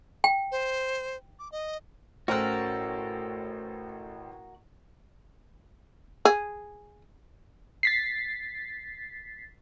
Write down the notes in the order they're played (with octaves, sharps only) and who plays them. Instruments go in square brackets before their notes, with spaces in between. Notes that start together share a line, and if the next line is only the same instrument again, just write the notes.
[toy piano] G5
[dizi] C5
D6
D#5
[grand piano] A1 G5 [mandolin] C#4 A4 [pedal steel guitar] F#4 A#4 F#6 [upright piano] C5
[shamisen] G#4
[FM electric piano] A6 B6 C7